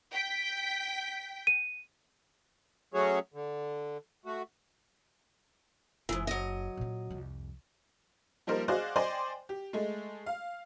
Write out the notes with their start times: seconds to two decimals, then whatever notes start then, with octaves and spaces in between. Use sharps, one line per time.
0.12 G5 B6
1.47 D#7
2.94 F#3 A3 C#4 F#4 G#4 C#5
3.34 D3
4.26 A3 F#4
6.09 F#1 G#2 E3
6.27 F#3 D#5
6.77 A#2 C#4
7.11 C2 F2
8.47 F3 G3 A#3 D#4 A#4 C5
8.68 F#4 G#4 C5 D5 D#5 F5
8.96 C5 D5 D#5 G5 G#5 C6
9.49 G4
9.73 G#3 A3
10.26 F5